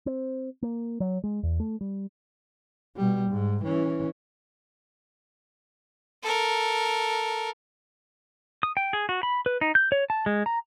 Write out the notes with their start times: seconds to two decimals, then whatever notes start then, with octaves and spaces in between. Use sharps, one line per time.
0.06 C4
0.63 A#3
1.00 F#3
1.24 G#3
1.43 E2
1.60 A3
1.81 G3
2.96 B2 G3
3.30 G#2
3.64 E3 C#4
6.23 A4 A#4
8.63 D#6
8.77 G5
8.93 G#4
9.09 F#4
9.23 B5
9.46 B4
9.61 D#4
9.75 G6
9.92 C#5
10.10 A5
10.26 G#3
10.46 A#5